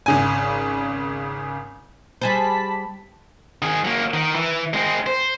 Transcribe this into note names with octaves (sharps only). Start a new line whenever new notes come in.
G#1 C#3 G#5
G3 G#4 C5 A5 B5 B6
D#3 G#4
F#3 A#3
D#3
E3
G#3 C4
C5